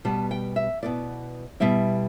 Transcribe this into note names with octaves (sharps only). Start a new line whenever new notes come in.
B2 G3 B3 A5
G5
E5
B2 B3 E4 D5
B2 G3 E4 E5